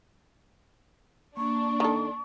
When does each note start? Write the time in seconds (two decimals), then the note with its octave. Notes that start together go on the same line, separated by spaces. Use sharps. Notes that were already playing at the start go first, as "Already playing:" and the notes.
1.37 A#3 D4 C#6
1.80 D#3 A4